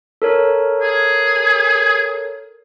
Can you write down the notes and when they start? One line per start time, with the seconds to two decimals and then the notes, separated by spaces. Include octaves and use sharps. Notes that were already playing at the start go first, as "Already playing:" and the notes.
0.22 A4 A#4 C#5
0.81 G#4